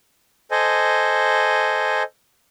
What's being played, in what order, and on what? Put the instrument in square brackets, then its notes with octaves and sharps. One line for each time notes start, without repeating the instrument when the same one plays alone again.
[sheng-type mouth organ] A4 C5 D#5 G#5